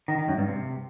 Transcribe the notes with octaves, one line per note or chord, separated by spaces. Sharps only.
D#3
D#3
F#2
G2
C3